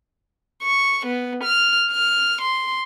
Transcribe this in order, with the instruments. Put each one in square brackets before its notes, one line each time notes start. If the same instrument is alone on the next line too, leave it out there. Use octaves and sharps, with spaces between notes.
[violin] C#6
B3
F6
F6
C6